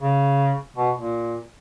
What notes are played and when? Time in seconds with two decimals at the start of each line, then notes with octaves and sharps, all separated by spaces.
0.01 C#3
0.77 B2
0.96 A#2